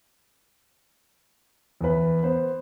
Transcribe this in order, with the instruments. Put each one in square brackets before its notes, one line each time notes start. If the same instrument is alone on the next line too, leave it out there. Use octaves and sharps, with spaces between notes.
[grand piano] E2 B4
B3 C5